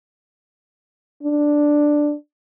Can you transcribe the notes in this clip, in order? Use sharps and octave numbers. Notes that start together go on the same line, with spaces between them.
D4